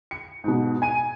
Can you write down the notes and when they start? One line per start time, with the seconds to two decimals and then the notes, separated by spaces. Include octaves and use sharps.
0.11 C#7
0.44 G#2 B2
0.82 G#5 D#7